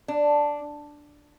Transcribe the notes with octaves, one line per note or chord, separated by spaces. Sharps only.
D4